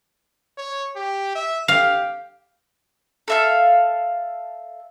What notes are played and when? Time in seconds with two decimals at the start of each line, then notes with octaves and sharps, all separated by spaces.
0.57 C#5
0.96 G4
1.35 E5
1.68 G4 F5
3.28 A4 E5 F5